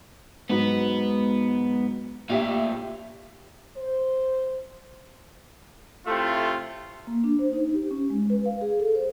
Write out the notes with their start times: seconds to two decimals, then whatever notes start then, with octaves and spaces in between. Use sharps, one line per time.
0.50 G#2 F#3 B3 B4
2.30 A#1 A2 G4 E5 F5
3.76 C5
6.07 A2 C3 A3 F4
7.07 A#3
7.24 D4
7.39 C5
7.53 D#4
7.74 G4
7.91 C#4
8.10 G#3
8.30 B4
8.46 F5
8.61 G#4
8.80 A4
8.95 C5